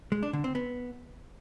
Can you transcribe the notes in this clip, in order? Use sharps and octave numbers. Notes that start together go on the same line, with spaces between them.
G#3
D4
D3
C4
B3